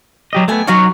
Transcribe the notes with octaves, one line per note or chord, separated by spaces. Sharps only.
F#3 G4 D#5
A3 B3 G5 G#5
F#3 C#4 D#4 F#4 C#5